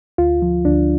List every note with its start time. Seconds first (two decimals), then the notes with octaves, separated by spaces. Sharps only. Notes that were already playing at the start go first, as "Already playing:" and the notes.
0.18 D2 F4
0.42 F3
0.65 D2 D4